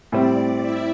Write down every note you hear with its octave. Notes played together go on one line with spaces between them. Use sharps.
A2 G3 C4 D5
E4 E5